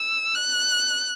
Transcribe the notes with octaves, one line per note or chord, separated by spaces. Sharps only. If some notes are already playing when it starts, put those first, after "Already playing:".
Already playing: E6
F#6